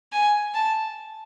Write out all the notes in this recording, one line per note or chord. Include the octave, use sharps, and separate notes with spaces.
G#5
A5